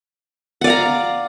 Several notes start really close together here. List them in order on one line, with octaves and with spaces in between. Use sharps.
F#5 D5 F5 A#5